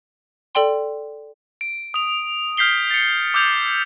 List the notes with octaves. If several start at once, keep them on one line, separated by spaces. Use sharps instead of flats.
A4 D5 G5 C6
D7
D#6 F7
F6 G6 B6 C7 G7
A6 C#7
D6 E6 G6 F7